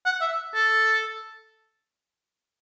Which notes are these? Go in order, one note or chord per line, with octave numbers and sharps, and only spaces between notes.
F#5
E5
A4